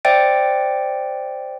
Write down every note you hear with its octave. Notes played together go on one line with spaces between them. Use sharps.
C5 D5 E5 G5 A6 D7